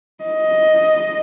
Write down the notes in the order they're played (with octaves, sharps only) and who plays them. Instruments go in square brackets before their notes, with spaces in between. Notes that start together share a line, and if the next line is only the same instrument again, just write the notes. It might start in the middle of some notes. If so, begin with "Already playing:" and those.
[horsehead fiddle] D#5